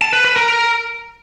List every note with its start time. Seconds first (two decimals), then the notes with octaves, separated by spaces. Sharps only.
0.01 A5
0.13 B4
0.25 B4
0.36 A#4